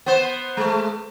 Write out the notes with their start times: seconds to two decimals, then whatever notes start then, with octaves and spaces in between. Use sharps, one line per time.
0.06 B3 C5
0.57 G#3 A3